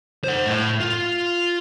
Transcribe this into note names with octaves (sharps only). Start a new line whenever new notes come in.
C5 F#5
A2
F4